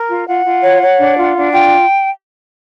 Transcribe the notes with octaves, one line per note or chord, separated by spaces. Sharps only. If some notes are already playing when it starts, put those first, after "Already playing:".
Already playing: A#4
F4
F4 F#5
F4
C#5
C#5
D4
F4
D4
F4 G5